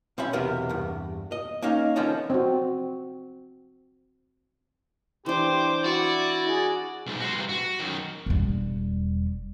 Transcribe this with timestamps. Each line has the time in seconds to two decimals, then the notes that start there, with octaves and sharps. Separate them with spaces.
0.18 B1 C4 C#4 E5 B5
0.33 B1 E2 C3 E3 B3 A#4
0.69 E2 G2
1.32 D#5
1.62 A#3 C#4 D#4 F5
1.96 D3 E3 F3 C4 C#4 D#4
2.30 C4 F#4
5.26 E3 D4 G4 C5 D6
5.85 E4 F#4 D5
6.48 G#4
7.07 B1 G#2
7.20 F#4 C5
7.33 G2 C3
7.49 F#4
7.79 F#2 D#3
8.26 E1 G3